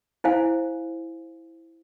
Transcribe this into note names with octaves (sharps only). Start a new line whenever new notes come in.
E4 C5 F5 G#5